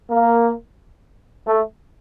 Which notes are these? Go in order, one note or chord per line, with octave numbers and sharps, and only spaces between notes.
A#3
A3